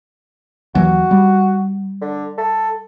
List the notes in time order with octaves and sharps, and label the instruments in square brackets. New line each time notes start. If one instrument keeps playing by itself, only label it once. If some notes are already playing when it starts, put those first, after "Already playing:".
[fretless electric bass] D#2 E3 F#3 [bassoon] F#4
[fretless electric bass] G3
[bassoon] D3
A4